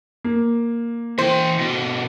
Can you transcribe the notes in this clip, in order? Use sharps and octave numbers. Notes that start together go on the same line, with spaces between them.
A#3
E3 C5 G5
B2 D3